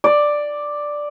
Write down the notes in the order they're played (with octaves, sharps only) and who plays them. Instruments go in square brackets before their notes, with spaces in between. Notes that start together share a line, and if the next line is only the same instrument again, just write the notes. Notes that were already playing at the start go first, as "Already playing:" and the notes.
[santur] D5